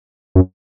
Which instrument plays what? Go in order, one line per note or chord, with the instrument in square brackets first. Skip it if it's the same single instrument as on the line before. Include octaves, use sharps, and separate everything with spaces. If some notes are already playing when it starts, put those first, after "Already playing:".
[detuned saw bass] F#2